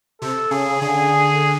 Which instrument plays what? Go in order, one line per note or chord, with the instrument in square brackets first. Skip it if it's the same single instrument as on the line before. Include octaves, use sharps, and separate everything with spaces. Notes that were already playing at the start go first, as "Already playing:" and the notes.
[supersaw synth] C3 [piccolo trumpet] A4
[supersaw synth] C#3 [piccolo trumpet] G#4
[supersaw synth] D3 [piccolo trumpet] G#4